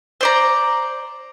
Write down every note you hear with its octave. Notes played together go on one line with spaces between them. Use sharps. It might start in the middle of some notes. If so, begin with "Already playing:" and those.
C5 D5 A#5